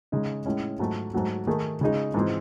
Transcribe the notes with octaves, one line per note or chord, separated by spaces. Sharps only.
C#3 G#3 D#4
A2 G#3 C#4
G#2 F#3 A3
G#2 F#3 A3
D#3 A3 D#4 G#4
C#3 G#3 D#4 G#4
G#2 E3 G#3 C4